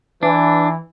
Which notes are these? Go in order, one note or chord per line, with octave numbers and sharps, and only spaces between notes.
E3 D4